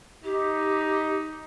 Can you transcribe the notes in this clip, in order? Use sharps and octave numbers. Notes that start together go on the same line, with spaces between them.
D#4 G4